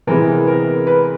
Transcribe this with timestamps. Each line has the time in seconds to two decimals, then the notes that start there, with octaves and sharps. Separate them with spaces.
0.07 C3 E3 G#3 B3 A#4
0.47 A#4
0.87 B4